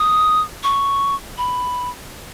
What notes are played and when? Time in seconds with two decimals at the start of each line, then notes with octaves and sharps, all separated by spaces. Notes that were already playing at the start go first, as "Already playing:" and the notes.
Already playing: D#6
0.63 C#6
1.38 B5